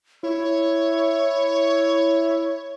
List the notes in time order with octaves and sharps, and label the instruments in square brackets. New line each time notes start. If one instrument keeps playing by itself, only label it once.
[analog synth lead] E4 [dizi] C#5